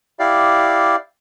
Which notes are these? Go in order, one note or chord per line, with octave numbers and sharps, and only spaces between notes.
E4 G4 D5 F5